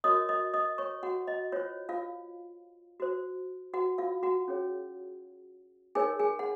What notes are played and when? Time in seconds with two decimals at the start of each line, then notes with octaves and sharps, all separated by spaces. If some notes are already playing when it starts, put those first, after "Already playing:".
0.04 F#4 A#4 C#5 D#5 D#6
0.29 D#5 D#6
0.54 D#5 D#6
0.78 C#5 C#6
1.03 F#4 F#5
1.27 D#5
1.52 F4 C5 C#5
1.89 F4 F5
3.00 F#4 C5
3.74 F#4 F#5
3.98 F4 F5
4.23 F#4 F#5
4.48 C#4 G#4 C#5
5.95 D#4 G#4 A#4 C#5 G#5
6.19 G#4 G#5
6.39 F#5